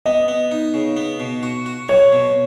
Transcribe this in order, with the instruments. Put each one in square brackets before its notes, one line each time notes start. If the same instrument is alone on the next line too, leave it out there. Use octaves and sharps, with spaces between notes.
[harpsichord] B3 [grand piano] D#5
[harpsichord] B3
D#4
C#3
B3
B2
F#4
F#4
[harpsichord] F#3 [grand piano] C#5
[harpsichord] B2